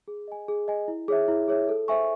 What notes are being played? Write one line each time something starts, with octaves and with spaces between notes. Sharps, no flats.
G#4
D#5 G#5
G#4
D#5 G#5
E4
G#4 C#5 E5
E4
G#4 C#5 E5
A4
C5 E5 G#5 C#6